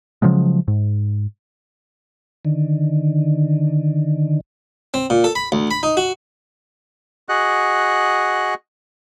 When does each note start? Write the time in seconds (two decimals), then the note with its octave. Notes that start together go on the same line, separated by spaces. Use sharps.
0.22 C#3 F3 F#3 G#3
0.68 G#2
2.45 D3 D#3
4.94 C4
5.10 A#2
5.24 A4
5.35 B5
5.52 D2
5.71 B5
5.83 D#4
5.97 F#4
7.29 F#4 G#4 D#5 F#5 F#6